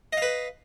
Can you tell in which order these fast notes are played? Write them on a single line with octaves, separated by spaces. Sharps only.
D#5 F5 B4